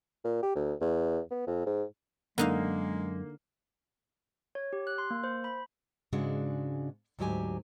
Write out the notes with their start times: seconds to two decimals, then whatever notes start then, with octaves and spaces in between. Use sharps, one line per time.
0.25 A#2
0.42 G4
0.55 D2
0.81 E2
1.31 B3
1.47 F2
1.66 G#2
2.38 F#2 D3 G#3 A#3 D#4 F5
4.55 C#5
4.73 G4
4.87 F#6
4.98 C6
5.10 A#3
5.24 C5
5.44 B5
6.13 G#2 C#3 G#3 D4 F#4
7.19 D2 G#2 F#3 G4 G#5